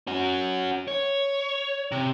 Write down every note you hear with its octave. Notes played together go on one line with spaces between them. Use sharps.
C#4 F#4
C#5
C3